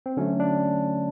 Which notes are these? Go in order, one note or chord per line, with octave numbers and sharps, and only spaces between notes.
C4
D3 F#3 A3 C#4
D4